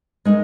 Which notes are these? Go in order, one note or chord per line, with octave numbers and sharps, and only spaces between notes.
G#3 D#4 A#4